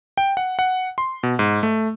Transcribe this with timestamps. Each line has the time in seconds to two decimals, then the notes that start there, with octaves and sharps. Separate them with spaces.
0.18 G5
0.37 F#5
0.59 F#5
0.98 C6
1.23 B2
1.39 G#2
1.63 A3